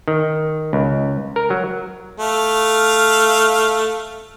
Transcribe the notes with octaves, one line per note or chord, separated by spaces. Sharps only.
D#3
C#2
A#4
F#3
A3 F5